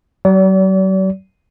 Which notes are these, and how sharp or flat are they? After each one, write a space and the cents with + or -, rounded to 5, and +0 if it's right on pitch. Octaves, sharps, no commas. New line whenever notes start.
F#3 +45 D5 -40